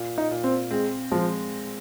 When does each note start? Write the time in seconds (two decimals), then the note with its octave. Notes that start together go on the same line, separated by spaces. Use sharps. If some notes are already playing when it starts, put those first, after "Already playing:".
Already playing: A#2
0.18 D#4
0.31 A#2
0.44 C4
0.71 G#3 C4
1.11 F3 G#3